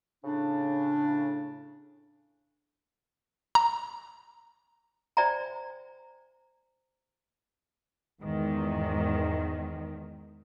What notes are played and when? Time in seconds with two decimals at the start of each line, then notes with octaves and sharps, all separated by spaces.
0.24 A2 C#3 D4
3.55 A#5
5.17 C5 D5 E5 G5 G#5 A#5
8.22 E2 G#2 D#3